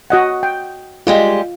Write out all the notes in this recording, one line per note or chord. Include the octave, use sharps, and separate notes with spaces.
F#4 D#5 F#5
G5
G3 G#3 F4 G4